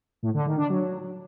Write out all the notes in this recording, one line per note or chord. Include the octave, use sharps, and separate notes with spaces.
A2
D3
D#3
D4
F#3